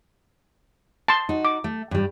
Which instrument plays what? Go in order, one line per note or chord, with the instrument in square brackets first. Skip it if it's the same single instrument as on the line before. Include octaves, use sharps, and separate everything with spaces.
[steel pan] A5 C6
[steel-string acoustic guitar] D#4 F#4
[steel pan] D6
[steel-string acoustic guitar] A3
G2 G3